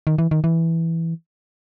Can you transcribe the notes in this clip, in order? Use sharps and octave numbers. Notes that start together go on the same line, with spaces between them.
D#3
E3
D#3
E3